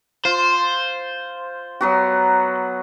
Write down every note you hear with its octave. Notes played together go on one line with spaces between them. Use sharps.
F4 C5
F#3 B3 F#4